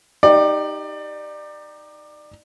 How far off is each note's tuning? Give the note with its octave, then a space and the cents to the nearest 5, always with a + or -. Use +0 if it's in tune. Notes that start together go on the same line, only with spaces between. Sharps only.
D#4 +0 G4 +0 D5 +25